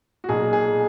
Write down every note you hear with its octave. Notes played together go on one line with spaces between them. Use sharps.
F#4
B1 A#2 G#4
G#4